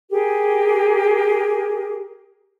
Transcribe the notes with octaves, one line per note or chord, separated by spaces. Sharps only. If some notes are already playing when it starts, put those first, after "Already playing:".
G4 G#4 A#4